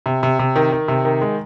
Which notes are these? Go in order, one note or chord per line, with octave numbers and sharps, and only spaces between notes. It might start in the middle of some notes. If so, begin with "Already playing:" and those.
C3
C3
C3
D#3
D#3
C3
D#3
G#3